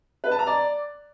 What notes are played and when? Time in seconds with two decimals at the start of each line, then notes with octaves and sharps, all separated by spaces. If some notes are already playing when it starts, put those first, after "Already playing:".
0.24 B4
0.31 A5
0.39 A#5
0.47 D5